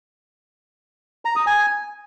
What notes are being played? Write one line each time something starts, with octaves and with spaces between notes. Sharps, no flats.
A#5
D#6
G#5